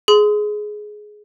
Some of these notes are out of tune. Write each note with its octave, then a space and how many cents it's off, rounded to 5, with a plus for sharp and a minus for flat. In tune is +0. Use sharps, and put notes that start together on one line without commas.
G#4 +15 C6 -30